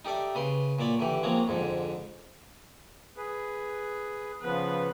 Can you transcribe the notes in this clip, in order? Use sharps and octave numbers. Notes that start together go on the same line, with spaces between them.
D#4 G4 A4 D5 E5
C#3 B4 C6
A#2 F#3 D5 B5
D3 E3 G4
F3 F#3 G#3 A#3 C4
F2 G#2 D3
G#4 B4
C#3 F3 B3 B4